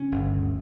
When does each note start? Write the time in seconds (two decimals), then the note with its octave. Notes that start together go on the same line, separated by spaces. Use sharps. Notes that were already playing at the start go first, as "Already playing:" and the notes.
Already playing: C#3 C#4
0.12 G1
0.33 D2